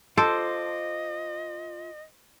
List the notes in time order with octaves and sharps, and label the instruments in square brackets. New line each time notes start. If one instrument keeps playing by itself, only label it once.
[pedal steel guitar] F4 D6 [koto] A4 [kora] C5 [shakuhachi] D#5